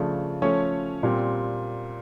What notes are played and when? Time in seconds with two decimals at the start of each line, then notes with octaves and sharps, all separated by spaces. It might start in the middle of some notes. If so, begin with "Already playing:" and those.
Already playing: C#3 F3 A3 D4
0.42 F3 A3 C#4 C#5
1.03 A#2 G3 C4